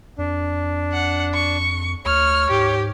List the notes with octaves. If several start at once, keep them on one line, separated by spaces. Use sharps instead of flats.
F2 D4
F#5
C#6
D2 C#5 F6
G#2 G4